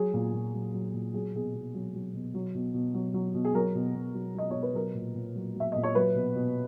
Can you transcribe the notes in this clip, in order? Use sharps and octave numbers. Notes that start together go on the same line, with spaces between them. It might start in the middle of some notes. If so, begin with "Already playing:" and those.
Already playing: F#3 G#4
A#2
A#2
F#3
F#3
A#2
F#3 G#4
B2 G#4
B2
F#3
F#3
B2
F#3
B2
B2
F#3
F#3
B2
G#4
F#3 A#4
B2
B2
F#3
F#3 D#5
B2 C#5
B4
F#3 A#4
A#2
A#2
F#3
F#3
E5
A#2 D#5
C#5
F#3 B4
B2
B2